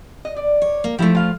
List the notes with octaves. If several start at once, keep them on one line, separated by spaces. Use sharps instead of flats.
D#5
D5
C#5
A#3
F3 A3 E4 G4
F4 F5